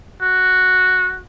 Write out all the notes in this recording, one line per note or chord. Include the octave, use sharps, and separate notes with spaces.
F#4